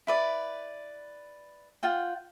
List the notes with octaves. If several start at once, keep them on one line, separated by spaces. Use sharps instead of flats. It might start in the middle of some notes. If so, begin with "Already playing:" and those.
E4 B4 D5
F4 F#5 G5